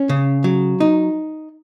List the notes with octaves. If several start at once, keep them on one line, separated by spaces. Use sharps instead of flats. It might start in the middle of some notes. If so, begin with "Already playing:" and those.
Already playing: C#4
C#3
F#3
D#4